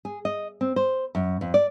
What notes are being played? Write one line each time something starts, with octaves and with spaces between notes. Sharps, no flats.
G#4
D#5
C4
C5
F#2
F2
D5